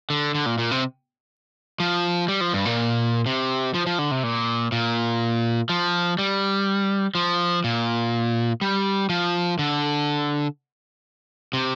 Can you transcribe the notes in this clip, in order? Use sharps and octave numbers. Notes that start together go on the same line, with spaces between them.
D3
D3
A#2
A#2
C3
F3
G3
F3
G2
A#2
C3
F3
F3
D3
C3
A#2
A#2
F3
G3
F3
A#2
G3
F3
D3
C3